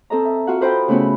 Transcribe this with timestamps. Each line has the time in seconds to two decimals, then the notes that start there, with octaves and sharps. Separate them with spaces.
0.10 C4 A4 D#5 A#5
0.25 E5
0.47 F4 F#4 F#5
0.61 A4 B4 C5 D#5 G5 B5
0.88 C#3 A3 B3 C#4 E4 F#4